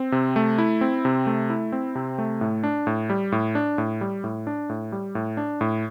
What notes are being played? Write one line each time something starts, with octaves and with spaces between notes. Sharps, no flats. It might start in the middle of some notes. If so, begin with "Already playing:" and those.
Already playing: C4
C3
A3
E4
C4
C3
A3
E4
C4
C3
A3
A2
D4
A2
G3
A2
D4
A2
G3
A2
D4
A2
G3
A2
D4
A2